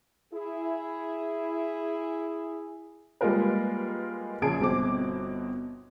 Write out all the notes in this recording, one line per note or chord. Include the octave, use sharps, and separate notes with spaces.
E4 G#4
G3 G#3 A#3 F4 A#4 B4
A#1 C#3 G#4 A5 G#6 D7
G1 B2 C4 D6